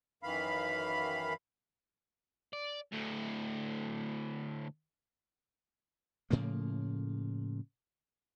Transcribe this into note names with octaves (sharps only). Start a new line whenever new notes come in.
F#2 D#3 E3 F5 B5
D5
D2 A2
A2 C#3 F3 A#3